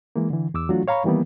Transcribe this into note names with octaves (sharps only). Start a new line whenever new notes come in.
E3 G#3 A#3
D3 E3
E2 D6 E6
E3 F#3 A3 D4 F4 F#4
C#5 F5 A#5 B5 C#6
D#3 E3 G3 A#3 B3